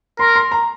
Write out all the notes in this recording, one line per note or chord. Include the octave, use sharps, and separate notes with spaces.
A#4 C6
C6
A#5